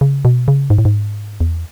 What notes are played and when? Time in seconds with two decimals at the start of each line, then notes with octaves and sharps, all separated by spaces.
0.01 C#3
0.25 B2
0.48 C#3
0.70 G#2
0.78 A2
0.85 G#2
1.40 E2